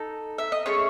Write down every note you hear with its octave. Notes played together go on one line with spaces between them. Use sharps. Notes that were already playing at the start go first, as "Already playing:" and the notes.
Already playing: D#4 A4
E5
D#5
A3 C#4 G#4 C#5